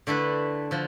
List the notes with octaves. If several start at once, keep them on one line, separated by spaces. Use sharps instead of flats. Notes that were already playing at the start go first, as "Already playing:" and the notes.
D3 A3 E4 B4
D3 F3